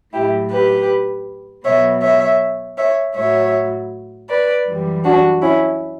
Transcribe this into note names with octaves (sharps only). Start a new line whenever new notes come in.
A2 F#3 E4 G4
G4 B4
B2 F#3 C#5 E5
C#5 E5
C#5 E5
A2 F#3 C#5 E5
B4 D5
F#2 E3 G3
D4 F#4
C#4 E4